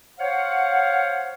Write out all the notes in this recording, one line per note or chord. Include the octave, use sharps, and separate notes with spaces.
C5 C#5 F5 F#5